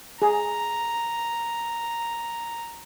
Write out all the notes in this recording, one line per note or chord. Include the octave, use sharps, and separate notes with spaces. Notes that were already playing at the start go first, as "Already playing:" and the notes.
G#4 A#5